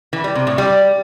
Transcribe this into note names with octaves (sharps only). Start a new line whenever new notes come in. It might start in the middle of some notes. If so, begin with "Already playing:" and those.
E3
G3
C3
A2
G3